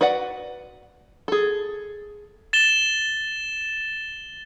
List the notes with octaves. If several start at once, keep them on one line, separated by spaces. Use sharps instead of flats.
F#4 B4 D5 F#5
G#4 A4
A6 E7 G7